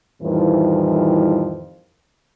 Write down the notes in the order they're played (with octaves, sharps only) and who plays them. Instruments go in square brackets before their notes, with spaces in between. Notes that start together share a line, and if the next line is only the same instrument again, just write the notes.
[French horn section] F2 A2 D#3 E3 G3